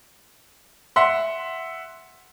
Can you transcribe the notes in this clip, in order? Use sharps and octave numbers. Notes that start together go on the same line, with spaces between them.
E5 F#5 C6